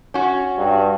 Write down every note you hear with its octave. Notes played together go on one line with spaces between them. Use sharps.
C#4 F#4
G2